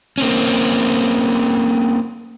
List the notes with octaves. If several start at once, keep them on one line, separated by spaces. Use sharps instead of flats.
A#3 C4 C#4